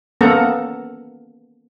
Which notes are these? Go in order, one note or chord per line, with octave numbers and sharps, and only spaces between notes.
A#3 B3 C#4 A4 F#5 A#5